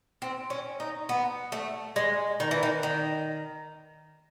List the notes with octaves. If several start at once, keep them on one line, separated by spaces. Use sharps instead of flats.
C4
C#4
D#4
B3
A3
G#3
D#3
E3
D#3
D#3